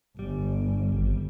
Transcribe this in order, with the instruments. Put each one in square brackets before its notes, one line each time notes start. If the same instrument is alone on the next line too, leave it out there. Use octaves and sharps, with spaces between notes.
[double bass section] G1 [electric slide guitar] G3
[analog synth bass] G#1